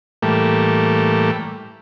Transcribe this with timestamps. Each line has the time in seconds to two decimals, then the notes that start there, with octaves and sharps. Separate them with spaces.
0.22 A2 E3 G3 A3 A#3